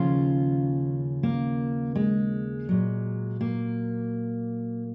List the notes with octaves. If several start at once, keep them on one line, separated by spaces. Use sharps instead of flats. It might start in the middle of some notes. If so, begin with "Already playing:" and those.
Already playing: D#2 C#3 F3 C#4 F4
A#3
G#3
A#2 F#3
A#3